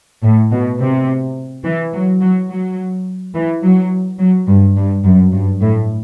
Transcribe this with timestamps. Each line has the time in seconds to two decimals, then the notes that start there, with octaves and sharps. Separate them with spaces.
0.23 A2
0.51 B2
0.79 C3
1.64 E3
1.93 F#3
2.21 F#3
2.50 F#3
3.34 E3
3.63 F#3
4.19 F#3
4.47 G2
4.76 G2
5.04 F#2
5.32 G2
5.61 A2